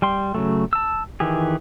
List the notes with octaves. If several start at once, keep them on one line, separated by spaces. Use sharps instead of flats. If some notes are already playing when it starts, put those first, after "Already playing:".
G3 G5 C6
C#3 F#3 A3
A5 E6
D#3 E3 G4 G#4